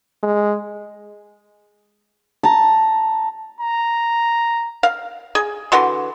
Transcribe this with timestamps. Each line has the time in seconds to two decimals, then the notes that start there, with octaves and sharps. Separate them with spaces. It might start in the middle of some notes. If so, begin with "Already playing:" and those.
0.23 G#3
2.43 A5 A#5
3.61 A#5
4.83 F5
5.35 G#4
5.72 D3 E3 F#4 C6